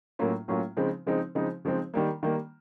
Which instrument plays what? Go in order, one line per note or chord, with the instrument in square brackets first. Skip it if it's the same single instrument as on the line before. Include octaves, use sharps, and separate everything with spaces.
[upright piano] A2 F#3 A#3 C#4 F4
A2 F#3 A#3 C#4 F4
C#3 F3 G#3 C4 D#4
C#3 F3 G#3 C4 D#4
C#3 F3 G#3 C4 D#4
C#3 F3 G#3 C4 D#4
D#3 G3 A#3
D#3 G3 A#3